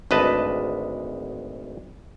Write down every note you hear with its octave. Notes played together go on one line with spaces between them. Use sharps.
G#1 D2 B4 D#5 A5